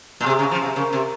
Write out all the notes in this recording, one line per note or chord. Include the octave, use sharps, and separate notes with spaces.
A#2
C3 G#4
C#3
F3
C3
C#3 A#4
C3